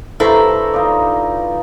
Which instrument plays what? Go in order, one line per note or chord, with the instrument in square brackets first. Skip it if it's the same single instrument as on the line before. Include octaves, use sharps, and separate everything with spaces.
[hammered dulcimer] G2 A#5 C#6 [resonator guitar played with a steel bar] E4 A4 C5
[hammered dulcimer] D#4 F4 D5